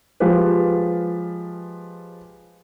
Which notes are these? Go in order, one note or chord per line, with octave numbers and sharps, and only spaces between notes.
F3 G#3 F4 G4 B4